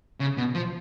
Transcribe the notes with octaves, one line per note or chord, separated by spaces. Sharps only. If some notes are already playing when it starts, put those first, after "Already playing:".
C#3
B2
F3